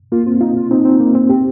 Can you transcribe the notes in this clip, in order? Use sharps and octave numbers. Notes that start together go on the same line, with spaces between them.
A#3 F4
C4 F4
D#4 F4
F4
C4 D#4
C4
A#3
C4
C4 G4